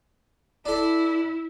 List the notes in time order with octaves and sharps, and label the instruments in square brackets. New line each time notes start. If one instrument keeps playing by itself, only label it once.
[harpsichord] D4 A4 [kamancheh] E4